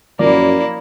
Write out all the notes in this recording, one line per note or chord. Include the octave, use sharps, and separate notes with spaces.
F#2 F3 A#3 E4 D5